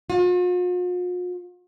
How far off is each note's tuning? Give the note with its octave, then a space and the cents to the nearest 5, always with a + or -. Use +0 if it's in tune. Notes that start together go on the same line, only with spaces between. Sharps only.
F4 +45